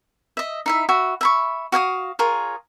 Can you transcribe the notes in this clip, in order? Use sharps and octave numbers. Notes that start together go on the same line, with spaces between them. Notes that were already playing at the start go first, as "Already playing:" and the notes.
D#5 E5
D#4 E4 E5
F#4 E5 B5
E5 B5 C#6
F#4 F5 G5 D#6
F4 G#4 A#4 C#5